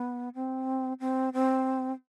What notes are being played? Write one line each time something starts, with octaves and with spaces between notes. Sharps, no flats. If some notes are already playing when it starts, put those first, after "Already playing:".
Already playing: B3
C4
C4
C4